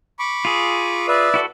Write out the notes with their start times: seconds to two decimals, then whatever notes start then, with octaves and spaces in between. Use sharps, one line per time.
0.19 B5 C#6 D6
0.45 F4 G#4
1.08 B4 D5 E5
1.34 E4 F#4 A4